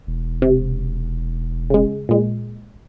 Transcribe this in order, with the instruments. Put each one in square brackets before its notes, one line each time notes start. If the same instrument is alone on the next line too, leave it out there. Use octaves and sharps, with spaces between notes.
[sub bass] E1
[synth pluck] C3
C#3 G#3
A#2 G#3